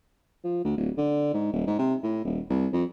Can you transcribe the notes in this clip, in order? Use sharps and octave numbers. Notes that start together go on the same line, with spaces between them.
F3
D2
D1
D3
G#2
D#1
G#2
C3
A2
D#1
C2
F2